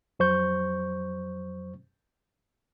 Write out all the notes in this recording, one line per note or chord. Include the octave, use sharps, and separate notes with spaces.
F2 F#3 C5 C#6 G6